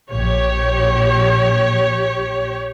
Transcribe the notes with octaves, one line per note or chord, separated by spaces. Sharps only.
A#1 G4 C#5